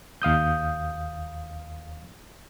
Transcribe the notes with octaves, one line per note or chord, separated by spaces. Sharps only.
D#2 F5 D#6 G6